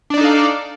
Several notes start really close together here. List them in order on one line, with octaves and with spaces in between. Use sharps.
D4 D5 D#4 A4 F5